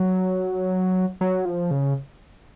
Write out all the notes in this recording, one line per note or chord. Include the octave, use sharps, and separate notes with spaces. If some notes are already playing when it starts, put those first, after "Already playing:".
Already playing: F#3
F#3
F3
C#3